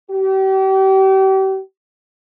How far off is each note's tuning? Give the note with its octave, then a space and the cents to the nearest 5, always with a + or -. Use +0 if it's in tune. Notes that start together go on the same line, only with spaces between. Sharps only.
G4 -35